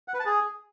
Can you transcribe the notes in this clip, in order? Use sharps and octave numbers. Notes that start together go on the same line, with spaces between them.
F#5
B4
A5
G#4